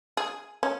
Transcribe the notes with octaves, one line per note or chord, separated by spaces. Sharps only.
G#4
C#4